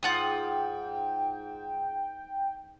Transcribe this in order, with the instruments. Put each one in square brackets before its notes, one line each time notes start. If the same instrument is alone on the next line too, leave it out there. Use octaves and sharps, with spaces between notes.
[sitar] G#2 [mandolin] F4 F#5 D#6 [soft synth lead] G5